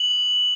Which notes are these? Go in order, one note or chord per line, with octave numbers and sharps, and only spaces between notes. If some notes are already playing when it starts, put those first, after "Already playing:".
Already playing: F#7